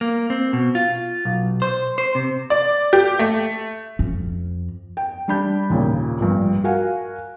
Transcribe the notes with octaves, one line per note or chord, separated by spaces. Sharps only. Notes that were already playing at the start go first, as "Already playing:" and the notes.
A#3
C4
B2
F4
B1
C5
C5
C3
D5
G4
A3
F2
G5
G3 D4 B5 G6
D#2 A#2 C#3
A#1 G2
F#4 A#4 F5 F#5 G#5